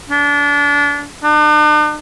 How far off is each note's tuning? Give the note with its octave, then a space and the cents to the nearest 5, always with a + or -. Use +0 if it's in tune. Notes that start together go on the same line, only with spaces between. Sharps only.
D4 -30
D4 +45